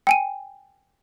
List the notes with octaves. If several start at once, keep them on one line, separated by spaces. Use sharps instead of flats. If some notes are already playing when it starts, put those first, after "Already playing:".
G5 G#5 D#7